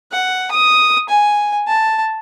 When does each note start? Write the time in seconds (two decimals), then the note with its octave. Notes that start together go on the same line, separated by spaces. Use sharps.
0.12 F#5
0.51 D#6
1.09 G#5
1.67 A5